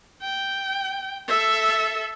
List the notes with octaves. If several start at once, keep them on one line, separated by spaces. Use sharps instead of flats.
G5
A4 E5